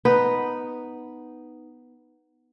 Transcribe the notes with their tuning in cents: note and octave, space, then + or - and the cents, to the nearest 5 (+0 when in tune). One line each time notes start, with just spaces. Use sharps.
B3 +0 D#4 +0 B4 +0